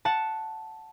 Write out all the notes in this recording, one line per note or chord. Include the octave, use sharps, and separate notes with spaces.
F#5 A5